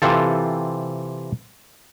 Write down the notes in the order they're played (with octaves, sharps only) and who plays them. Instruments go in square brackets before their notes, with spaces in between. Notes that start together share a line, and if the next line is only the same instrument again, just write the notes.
[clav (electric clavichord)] C3 E3 C4 F4 A4